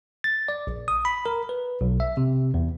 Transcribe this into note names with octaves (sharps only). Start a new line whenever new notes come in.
A6
D5
A#1
D#6
B5
A#4
B4
B1
E5
C3
E2